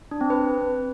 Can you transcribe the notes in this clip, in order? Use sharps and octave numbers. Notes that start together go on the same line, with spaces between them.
D4
C4
B4